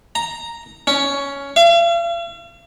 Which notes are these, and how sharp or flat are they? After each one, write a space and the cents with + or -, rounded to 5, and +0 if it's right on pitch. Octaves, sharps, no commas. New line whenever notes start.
A#5 +0
C#4 +10
F5 -45